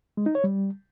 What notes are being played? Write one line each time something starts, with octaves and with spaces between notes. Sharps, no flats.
G#3
D#4
C#5
G3